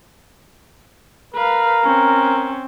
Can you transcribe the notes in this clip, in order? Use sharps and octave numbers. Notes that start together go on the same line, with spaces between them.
A#4 B4 F5
C4 C#4